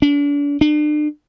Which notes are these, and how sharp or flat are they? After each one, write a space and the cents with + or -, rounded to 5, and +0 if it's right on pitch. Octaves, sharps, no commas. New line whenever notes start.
D4 -40
D4 +40